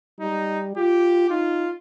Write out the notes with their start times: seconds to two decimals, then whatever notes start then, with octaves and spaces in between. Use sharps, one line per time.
0.20 G3 D#4
0.77 F4 G4
1.30 D#4 F4